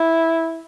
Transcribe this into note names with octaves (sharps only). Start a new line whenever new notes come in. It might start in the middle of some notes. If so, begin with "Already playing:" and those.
Already playing: E4